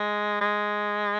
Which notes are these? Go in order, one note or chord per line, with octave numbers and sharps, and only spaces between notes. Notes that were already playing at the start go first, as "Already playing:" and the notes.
Already playing: G#3
G#3